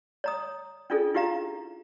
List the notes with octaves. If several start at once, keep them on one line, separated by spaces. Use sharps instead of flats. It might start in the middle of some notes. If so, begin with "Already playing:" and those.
C#5 A#5 D#6
C#4 D4 F4 G#4 A4
E4 F4 G4 F5 A#5